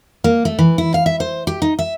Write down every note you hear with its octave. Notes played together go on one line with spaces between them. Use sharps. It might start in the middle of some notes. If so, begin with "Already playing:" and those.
A#3
A3
E3
E4
F5
E5
C5
G4
D#4
E5